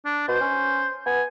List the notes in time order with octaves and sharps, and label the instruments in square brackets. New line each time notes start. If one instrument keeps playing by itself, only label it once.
[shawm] D4
[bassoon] B2 [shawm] C5
[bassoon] C#4
[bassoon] B3 [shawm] G#5